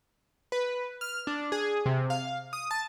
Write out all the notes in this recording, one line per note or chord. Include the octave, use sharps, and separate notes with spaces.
B4
F6
D4
G#4
C3
F5
D#6
A5